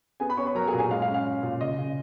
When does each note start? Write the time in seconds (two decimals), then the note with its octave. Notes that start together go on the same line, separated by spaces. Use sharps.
0.20 B3 G#4 G#5
0.29 B4 B5
0.37 B3 C#5 C#6
0.46 B4 B5
0.55 F#3 A#4 A#5
0.68 G#4 G#5
0.74 A#2
0.79 G#4 G#5
0.91 G#3 F5
1.02 F5
1.08 C#4
1.14 F5
1.26 C#4
1.43 A#2
1.61 C#3 D#5
1.78 C#3